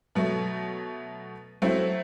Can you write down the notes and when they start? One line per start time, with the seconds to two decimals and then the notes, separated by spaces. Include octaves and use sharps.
0.15 B2 F#3 A3
1.62 F#3 A3 C4 E4